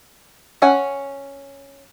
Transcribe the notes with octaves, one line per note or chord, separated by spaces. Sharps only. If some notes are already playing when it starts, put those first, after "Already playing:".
C#4 F#5 G#5